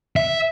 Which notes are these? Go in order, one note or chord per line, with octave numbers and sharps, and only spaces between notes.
E5